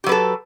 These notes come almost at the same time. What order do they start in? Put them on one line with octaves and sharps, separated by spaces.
G4 F#3 B4 A4